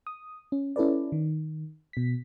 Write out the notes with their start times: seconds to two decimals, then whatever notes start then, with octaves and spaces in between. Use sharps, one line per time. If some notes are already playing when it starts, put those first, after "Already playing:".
0.07 D#6
0.52 C#4
0.76 C#4 E4 A4 B4 D5
1.12 D#3
1.93 B2 B6